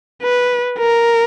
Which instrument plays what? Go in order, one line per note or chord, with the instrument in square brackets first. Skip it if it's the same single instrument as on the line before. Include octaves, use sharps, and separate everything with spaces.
[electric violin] B4
A#4